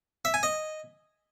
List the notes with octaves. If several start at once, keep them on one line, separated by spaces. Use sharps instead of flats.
E5
G#5
D#5